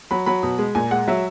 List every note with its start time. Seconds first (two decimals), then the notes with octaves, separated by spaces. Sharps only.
0.11 F#3 B5
0.26 F#3 B5
0.43 B2
0.58 G#3
0.75 A#2 G#5
0.91 G#3 F#5
1.08 F#3 E5